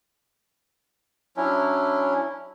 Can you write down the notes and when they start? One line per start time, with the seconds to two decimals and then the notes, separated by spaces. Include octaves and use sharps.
1.37 F#3 C#4 D4 E4